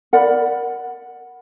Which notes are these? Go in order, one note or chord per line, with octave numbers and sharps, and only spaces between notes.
A#4 D5 F#5 B5